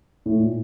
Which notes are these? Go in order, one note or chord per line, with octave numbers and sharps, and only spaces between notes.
A2
A#2